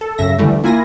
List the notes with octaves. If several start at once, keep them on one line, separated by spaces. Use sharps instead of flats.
A4
F#2 C#3 E5 A#6
D3 E3 G3 A3
D2
A#3 E4 F4 G#5 A#6